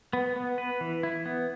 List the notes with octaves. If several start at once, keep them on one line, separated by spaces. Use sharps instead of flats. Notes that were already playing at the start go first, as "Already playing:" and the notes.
B3
B3
B4
E3
E4
B3